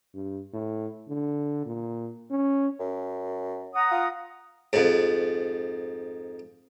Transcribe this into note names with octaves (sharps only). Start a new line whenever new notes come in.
G2
A2
D3
A#2
C#4
F#2
F#5 A#5 D#6
F4
F2 G#2